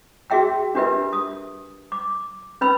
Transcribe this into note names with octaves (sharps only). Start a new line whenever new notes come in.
F#4 G#4 E5 G5 E6
D4 F4 G4 A#4 B4 E5
D#6
D6
C#4 B4 B5 E6